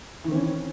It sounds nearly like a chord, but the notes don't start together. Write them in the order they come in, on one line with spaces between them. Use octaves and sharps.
E3 D#3 C4 C#4